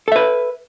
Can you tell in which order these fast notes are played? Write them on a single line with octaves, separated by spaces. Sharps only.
A4 E5 B4